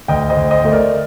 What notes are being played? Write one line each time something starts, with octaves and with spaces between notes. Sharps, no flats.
D2 D#5 G5
C5 D#5
D2
C5 D#5
A3 C5
A#4 D5